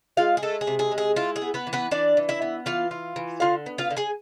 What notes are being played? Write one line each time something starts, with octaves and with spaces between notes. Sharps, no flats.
G#3 F4 F5
G#4
G#3 A3 A4
G#4
C3
G#4
G#3
G#4
E4 F4
G#4
B3
B3 B4
E3
B3 B4
E3 D4 D5
E3
E4 E5
B3
E3 F4 F5
F4
E3
D3 F4 F5
B3
F4 F5
D3
G#4 G#5